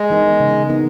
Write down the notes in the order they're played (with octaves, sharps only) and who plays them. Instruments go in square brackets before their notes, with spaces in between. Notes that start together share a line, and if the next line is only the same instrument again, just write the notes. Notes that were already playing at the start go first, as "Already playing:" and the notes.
Already playing: [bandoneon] G#3
[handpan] E3 B3 D#4 A#4
C#3
E3 B3 D#4 A#4